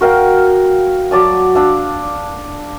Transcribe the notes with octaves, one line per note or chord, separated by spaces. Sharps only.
F#4 A#4 F5 G5
F#3 D5 A5 D#6
D4 F5 E6